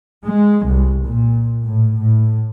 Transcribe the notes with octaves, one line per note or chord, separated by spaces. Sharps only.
G#3
C2
A#2
A2
A2